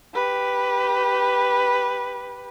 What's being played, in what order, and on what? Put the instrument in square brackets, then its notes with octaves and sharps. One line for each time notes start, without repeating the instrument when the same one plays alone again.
[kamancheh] G4 B4